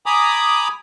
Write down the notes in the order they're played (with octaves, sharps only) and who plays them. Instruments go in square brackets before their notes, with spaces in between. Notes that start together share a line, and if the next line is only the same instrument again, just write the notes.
[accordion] G#5 A#5 B5 D6 D#6